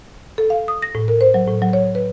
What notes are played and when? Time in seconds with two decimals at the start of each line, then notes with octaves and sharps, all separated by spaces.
0.38 A4
0.50 F5
0.68 D#6
0.82 A#6
0.95 A2
1.08 A#4
1.21 C5
1.34 F#3
1.48 A2
1.62 F#3
1.73 C#5
1.95 B4